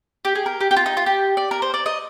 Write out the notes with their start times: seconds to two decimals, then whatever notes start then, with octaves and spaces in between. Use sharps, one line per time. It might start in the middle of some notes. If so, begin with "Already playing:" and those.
0.25 G4
0.35 G#4
0.46 A#4
0.61 G4
0.71 G4
0.76 F4
0.86 D#4
0.97 F4
1.06 G4
1.37 D5
1.51 A#4
1.62 C5
1.74 D5
1.86 D#5